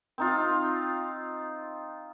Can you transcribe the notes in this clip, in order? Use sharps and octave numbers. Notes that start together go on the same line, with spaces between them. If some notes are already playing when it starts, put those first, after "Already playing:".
C4 D#4 F4